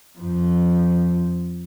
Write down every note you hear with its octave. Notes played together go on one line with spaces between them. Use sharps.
F2 F3